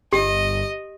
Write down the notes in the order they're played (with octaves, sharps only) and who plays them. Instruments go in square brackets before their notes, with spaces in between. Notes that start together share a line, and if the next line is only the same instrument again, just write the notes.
[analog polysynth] G1 [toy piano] G4 [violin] D#5